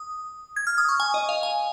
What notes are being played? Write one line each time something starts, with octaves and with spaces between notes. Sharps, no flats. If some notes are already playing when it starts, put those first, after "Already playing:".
Already playing: D#6
G#6
F6
D#6
C#6
G#5
D#5
F5
G#5